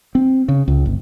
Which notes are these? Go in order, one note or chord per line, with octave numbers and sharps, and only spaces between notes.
C4
C#3
C#2
G1